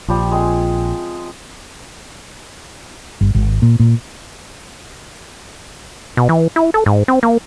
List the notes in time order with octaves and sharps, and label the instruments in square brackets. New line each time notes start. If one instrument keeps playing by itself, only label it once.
[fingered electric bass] A#1 [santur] F3 G3
[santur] G#3 C4 G#5
[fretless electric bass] G1
G#1
A#2
A#2
[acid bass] B2
E3
E4
A4
G#2
C4
A#3